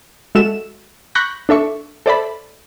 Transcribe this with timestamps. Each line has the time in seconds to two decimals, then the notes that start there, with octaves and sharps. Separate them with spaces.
0.35 G#3 F#4 A4 E5 E7
1.15 B5 C#6 F#6 G6 A#6
1.49 D4 A4 E5 C#6
2.06 A4 C5 D5 E5 A5 B5